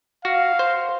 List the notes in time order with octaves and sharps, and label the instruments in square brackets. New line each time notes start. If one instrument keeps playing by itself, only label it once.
[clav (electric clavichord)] F#4 [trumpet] F5
[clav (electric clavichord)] C5